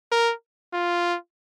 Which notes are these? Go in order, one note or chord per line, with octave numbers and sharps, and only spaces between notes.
A#4
F4